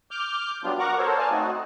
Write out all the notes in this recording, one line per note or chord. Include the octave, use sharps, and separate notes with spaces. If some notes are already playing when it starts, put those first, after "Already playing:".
D6 F6 G6
F#3 G3 B3 D4 F4
F#4 A#4 F#5 A#5 C#6 D6
B3 A4 A#4 C5 C#5
D5 F5 G#5 A5
A3 C4 D#4 F#4